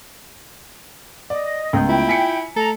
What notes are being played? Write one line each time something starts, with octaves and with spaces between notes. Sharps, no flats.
D5 D#5
C#2 A3 B3 G6
E4 F4 G5
G#5 B6 C#7
A3 A4 A#5